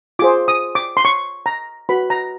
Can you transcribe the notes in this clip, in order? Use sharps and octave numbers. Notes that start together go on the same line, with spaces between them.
F4 G#4 C5 D6
D#6
D6
C6
C#6
A#5
F#4 B4 B5
A#5